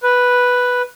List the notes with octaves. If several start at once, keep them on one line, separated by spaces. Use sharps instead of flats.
B4